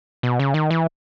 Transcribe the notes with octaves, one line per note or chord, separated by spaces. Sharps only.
B2
C#3
D#3
E3